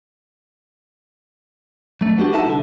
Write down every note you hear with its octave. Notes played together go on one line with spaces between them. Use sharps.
F#3 A3
B3 D4 F#4 G4
D#4 E4 A4 E5 F#5 A5
C2 D3